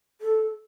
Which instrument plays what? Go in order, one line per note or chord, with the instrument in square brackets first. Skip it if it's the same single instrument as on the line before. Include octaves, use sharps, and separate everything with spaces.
[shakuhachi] A4